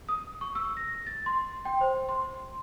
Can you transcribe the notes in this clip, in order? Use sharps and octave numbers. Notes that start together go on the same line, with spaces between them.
D#6
C#6
E6
A#6
A6
C6
G5
C5
C6